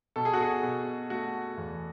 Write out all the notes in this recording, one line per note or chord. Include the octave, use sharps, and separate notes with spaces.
B2 A4
G#4
F#4
G#4
B2
A3 F#4
E2